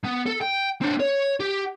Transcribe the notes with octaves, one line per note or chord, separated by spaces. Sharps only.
B3
A4
G5
C4 D4
C#5
G4